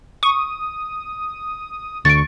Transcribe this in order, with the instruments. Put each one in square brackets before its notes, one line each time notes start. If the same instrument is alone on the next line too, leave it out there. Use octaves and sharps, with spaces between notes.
[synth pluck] C#6 [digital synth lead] D#6
[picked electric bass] D2 D3 [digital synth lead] C#6 [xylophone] A6 D7